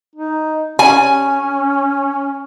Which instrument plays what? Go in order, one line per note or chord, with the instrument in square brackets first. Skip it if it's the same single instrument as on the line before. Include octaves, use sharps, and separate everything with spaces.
[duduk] D#4
[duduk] C#4 [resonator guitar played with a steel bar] G#5